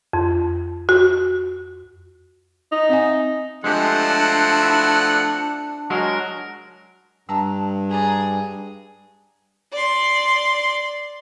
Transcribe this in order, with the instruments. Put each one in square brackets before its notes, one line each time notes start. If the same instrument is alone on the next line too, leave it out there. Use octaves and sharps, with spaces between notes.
[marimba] F2
F#4
[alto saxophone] D#4
[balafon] C4 E5 G#5
[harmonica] F3 A3 C4 [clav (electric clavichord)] G#3 G4 [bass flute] D4 [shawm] F#5
[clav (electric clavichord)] E4
[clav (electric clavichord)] F#3 G#3 F#4 [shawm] A#4
[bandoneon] G2 [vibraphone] G3 [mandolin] A5 A#5 E6
[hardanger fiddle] G#4 [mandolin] D5 A#5 B5
[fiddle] D5 C6